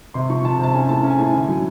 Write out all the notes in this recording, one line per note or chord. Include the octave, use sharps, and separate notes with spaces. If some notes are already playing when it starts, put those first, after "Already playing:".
C3 C6
F3 C#6
C3 A5
C3 A5
C#4 G#5
A2 A5
C#4
G#5
A2 A5
D3 G#5
F#3